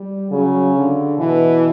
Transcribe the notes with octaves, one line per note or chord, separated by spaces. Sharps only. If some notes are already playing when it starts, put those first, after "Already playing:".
Already playing: G3
C#3 F#3
D3
B2 E3